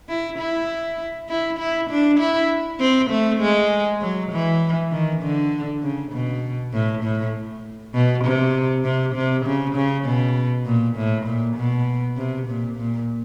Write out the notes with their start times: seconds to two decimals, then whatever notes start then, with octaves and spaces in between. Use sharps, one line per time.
0.09 E4
0.38 E4
1.29 E4
1.59 E4
1.90 D4
2.20 E4
2.80 C4
3.10 A3
3.40 G#3
4.01 F#3
4.31 E3
4.92 D#3
5.21 D3
5.83 C#3
6.12 B2
6.73 A2
7.03 A2
7.94 B2
8.24 C3
8.84 C3
9.15 C3
9.46 C#3
9.76 C#3
10.05 B2
10.66 A#2
10.96 A2
11.26 A#2
11.56 B2
12.17 C3
12.47 A#2
12.77 A#2